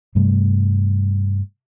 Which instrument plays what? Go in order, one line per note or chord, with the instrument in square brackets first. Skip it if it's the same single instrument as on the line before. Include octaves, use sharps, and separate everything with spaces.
[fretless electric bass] G2 C3 G3 A3